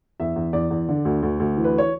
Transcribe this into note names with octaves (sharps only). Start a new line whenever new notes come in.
E2 E5
E2
E2 D5
E2
D3
D2
D2
D2
E3
B4
C#5